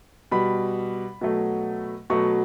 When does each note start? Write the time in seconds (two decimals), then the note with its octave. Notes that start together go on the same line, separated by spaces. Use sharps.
0.32 B2 G3 B5
1.21 B2 F#3 A3
2.10 B2 F#3 A3 C#6